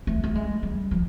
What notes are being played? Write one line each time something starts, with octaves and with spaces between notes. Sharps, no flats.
A3
A3
G#3
G3
F3